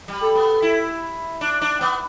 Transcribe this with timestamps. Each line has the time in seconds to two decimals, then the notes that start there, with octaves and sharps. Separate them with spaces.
0.08 G3
0.22 A4
0.35 B3
0.62 E4
1.41 D4
1.61 D4
1.81 B3